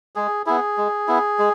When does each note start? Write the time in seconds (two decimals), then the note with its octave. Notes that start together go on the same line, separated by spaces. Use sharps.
0.15 G#3 G#4
0.46 B3 E4 G#4
0.77 G#3
1.08 B3 E4
1.39 G#3